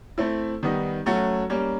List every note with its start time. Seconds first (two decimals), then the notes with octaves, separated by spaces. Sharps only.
0.18 A3 C4 E4
0.63 D#3 G3 B3 D#4
1.06 F#3 A3 C#4 F#4
1.50 G3 A#3 C#4